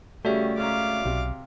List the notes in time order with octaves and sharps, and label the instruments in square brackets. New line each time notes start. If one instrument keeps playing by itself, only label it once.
[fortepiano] C#3 G3 C#4 [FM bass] A3 [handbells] F#4 D5 E5 [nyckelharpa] G4
[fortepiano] C#2 C#4 A#5 [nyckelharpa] F5 D6
[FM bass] B1 [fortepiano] C3